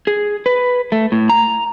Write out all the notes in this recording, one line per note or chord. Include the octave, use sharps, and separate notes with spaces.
G#4
B4
A3
A2
A#5